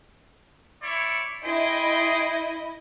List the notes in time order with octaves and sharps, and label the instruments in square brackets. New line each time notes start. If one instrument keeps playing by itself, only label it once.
[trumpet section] E4 C#5 D5
[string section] E4 D#5 [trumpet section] G#4 G5 C6